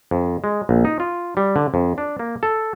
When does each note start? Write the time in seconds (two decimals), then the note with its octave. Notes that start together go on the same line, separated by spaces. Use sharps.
0.11 F2
0.44 G#3
0.69 A#1
0.85 D#4
1.00 F4
1.37 G3
1.56 D3
1.74 F2
1.98 D4
2.19 A#3
2.43 A4